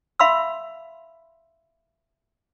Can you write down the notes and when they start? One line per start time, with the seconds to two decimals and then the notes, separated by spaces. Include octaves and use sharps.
0.19 E5 F5 B5 C6 E6